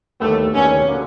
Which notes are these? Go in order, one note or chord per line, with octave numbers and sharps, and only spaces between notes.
D#2 D3 G3 A3 B3
D#2 D3 G3 B3 C#4
D3 F#3 A#3